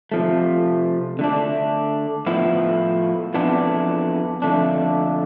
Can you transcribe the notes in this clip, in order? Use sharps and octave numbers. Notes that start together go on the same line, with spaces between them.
C3 F3 A3
D3 A3 D4
A2 F3 B3 E4
F2 E3 B3 D4
F2 D3 A3 D4